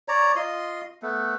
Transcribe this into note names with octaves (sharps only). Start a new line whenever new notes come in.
C#5 D5 A#5
F4 D#5 C6
A3 B3